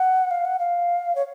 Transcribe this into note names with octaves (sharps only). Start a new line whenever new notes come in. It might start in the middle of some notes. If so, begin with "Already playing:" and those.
Already playing: F#5
F5
F#5
F5
C#5